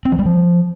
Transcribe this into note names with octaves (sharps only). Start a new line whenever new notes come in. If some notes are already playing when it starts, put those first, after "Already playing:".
C4
F3
G3
F3